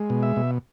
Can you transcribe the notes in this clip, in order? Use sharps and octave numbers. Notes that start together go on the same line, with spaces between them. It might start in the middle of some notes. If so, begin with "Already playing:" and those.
Already playing: G#3
B2
E5
B2